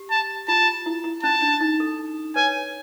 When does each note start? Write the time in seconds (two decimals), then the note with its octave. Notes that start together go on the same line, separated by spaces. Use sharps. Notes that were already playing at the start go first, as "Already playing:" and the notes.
Already playing: G4
0.10 A5
0.48 F4 A5
0.86 E4
1.04 E4
1.23 C#4 A5
1.42 D4
1.61 D#4
1.80 A4
2.36 B4 C#5 G#5